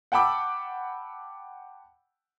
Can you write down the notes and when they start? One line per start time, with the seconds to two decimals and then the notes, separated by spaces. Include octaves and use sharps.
0.12 F#5 G5 A5 B5 D6 E6